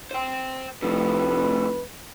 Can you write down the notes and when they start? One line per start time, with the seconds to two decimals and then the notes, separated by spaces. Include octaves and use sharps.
0.11 C5 G5
0.82 F1 F2 A2 B4